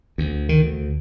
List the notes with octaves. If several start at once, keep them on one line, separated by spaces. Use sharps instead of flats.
D2
D#3
D2